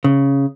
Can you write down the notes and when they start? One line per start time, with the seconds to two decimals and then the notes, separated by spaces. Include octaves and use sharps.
0.04 C#3